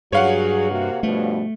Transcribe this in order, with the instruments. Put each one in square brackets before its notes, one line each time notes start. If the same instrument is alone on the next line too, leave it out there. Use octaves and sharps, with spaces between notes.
[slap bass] G2 [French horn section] F#3 G#4 [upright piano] C#5 F5 F#5
[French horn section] C3 A#3 F#4
[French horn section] G2 B2 F3 [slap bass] A3